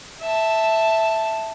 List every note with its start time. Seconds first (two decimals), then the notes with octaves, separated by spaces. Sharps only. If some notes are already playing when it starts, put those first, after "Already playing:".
0.21 E5 A5